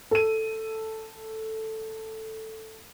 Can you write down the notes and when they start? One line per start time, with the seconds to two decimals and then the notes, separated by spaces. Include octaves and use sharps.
0.11 A4 D#7